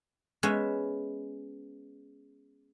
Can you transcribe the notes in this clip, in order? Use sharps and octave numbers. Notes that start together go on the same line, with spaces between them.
G#3 B3 C#4 B4 E5